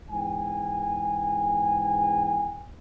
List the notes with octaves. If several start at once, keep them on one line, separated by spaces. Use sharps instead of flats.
E2 G#2 G5 G#5